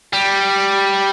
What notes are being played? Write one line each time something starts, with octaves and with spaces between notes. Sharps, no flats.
G3